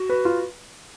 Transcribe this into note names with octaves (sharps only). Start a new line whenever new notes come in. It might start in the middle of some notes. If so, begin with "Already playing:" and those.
Already playing: F#4
B4
F4